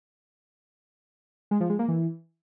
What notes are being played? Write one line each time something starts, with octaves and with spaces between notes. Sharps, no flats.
G#3
F3
G#3
A#3
E3